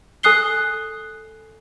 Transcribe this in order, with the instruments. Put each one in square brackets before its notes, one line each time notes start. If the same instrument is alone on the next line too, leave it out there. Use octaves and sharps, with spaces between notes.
[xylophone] A4 G#5 D#6 F#6 C7 G7